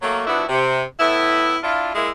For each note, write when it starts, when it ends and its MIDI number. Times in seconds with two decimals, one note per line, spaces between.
0.03 0.25 54
0.03 0.25 57
0.03 0.25 58
0.27 0.44 53
0.27 0.44 59
0.27 0.44 62
0.27 0.44 64
0.27 0.44 66
0.49 0.81 48
1.00 1.56 45
1.00 1.56 59
1.00 1.56 64
1.63 1.92 62
1.63 1.92 64
1.63 1.92 65
1.95 2.09 56
1.95 2.09 58
1.95 2.09 64